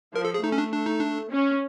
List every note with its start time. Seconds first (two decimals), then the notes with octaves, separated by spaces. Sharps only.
0.15 F3 A#4
0.25 A4
0.34 G#4
0.43 A3 D#4
0.52 C#4
0.58 D4
0.72 D4
0.86 D#4
1.00 D4
1.30 C#4